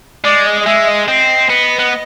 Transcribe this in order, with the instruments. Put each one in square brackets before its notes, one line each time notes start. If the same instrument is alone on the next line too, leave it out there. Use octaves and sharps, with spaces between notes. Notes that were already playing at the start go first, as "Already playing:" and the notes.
[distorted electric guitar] G#3 [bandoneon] D5
[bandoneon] D#5
D#5
[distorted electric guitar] G#3 [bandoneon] E5
[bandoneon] D#5
[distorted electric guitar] C4 [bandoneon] D#5
[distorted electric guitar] B3
B3